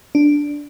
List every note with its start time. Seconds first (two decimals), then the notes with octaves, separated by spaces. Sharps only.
0.15 D4